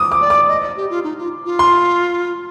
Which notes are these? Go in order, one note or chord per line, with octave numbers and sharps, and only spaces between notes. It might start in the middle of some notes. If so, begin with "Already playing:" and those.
Already playing: D6 D#6
D6
D5
D6
D#5
D5
G4
F4
D#4
F4
F4
C6